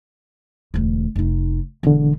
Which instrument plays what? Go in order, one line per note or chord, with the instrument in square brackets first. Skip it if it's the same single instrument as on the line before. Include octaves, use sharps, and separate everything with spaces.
[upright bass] E1 D2
F1 D#4
[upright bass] E1 [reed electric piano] E2 D3